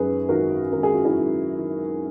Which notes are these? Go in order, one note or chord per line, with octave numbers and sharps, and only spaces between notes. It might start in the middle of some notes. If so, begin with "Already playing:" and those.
Already playing: F#2 D#3 G#4 B4
G#1 F#4 A#4
G#1 A#4
G#4
F#4
E4 G#4
G#1
D#3